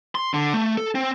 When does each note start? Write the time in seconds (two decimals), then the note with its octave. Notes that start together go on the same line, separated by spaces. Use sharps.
0.15 C6
0.34 D3
0.53 A3
0.77 A4
0.95 C4